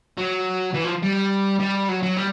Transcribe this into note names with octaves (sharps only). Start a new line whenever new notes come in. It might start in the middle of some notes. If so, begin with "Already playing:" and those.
F#3
E3
F3
G3
G3
F#3
F#3
G3